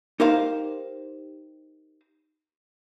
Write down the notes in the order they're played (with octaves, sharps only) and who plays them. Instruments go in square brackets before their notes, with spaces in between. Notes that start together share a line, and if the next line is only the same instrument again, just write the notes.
[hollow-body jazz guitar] D#4 G4 A#4 C5 F5